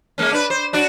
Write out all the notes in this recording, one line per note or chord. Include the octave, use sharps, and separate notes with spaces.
G#3 A#3 C#4
D4 B4
C5
D4 F#4 D5